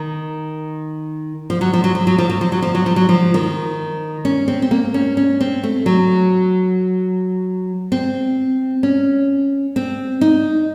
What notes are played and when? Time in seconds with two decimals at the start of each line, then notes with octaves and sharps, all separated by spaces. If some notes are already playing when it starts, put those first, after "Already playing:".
Already playing: D#3
1.50 F3
1.61 F#3
1.73 F3
1.84 F#3
1.95 F3
2.07 F#3
2.18 F3
2.30 F#3
2.41 F3
2.52 F#3
2.62 F3
2.75 F#3
2.86 F3
2.96 F#3
3.09 F3
3.34 D#3
4.25 C#4
4.48 C4
4.62 C4
4.71 A#3
4.94 C#4
5.17 C#4
5.41 C4
5.63 A3
5.86 F#3
7.92 C4
8.83 C#4
9.76 C4
10.21 D#4